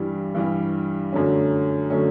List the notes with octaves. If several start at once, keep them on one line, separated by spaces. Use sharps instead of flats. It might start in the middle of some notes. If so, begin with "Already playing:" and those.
Already playing: G2 E3 G3
G2 E3 G3
F#2 D3 F#3 A3 C#4
D3 F#3 A3 C#4